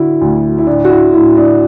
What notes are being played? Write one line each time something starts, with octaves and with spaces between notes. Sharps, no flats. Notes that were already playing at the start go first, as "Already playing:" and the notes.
Already playing: D3 E4 F#4
D2
E4
A2 D4
F#4
E4
A2 E4
D4